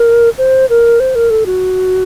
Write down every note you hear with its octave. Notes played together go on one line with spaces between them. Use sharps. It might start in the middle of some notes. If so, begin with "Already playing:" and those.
Already playing: A#4
C5
A#4
C5
A#4
A4
F#4